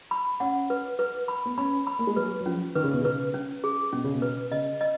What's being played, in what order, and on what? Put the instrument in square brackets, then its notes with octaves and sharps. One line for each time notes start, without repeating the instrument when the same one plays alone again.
[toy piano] B5
[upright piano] C#4 [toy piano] F#5
[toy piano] B4
B4
B5
[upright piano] B3
[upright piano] C#4 [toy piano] B5
[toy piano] B5
[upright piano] A#3
G#3
[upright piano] F#3 [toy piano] B4
[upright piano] F#3
[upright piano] F3 [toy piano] C#4
[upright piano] D#3 [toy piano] B4
[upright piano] C#3
B2
[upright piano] C#3 [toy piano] B4
[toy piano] C#4
G#4
[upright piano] B2 [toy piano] C#4
[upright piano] C#3
B2
[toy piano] B4
[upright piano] C#3 [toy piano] D#5
[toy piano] D#5